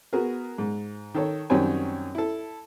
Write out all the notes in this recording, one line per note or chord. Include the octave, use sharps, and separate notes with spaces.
B3 F#4 G#4 A#4
G#2
D#3 A4 C#5
F#2 D#3 G3 C4 C#5 G#5
E4 A4